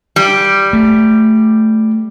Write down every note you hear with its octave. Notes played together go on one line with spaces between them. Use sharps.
G3
A3